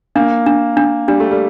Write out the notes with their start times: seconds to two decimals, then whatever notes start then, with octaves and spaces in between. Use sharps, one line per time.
0.15 A#3 D4
0.46 D4
0.77 D4
1.08 G3 D4
1.20 A3
1.31 G3